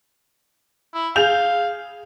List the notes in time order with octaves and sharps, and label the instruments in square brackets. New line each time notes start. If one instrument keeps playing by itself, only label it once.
[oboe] E4
[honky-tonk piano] G#4 G6 F7 [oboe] F5